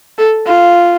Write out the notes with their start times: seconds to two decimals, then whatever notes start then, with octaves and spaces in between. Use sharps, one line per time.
0.18 A4
0.47 F4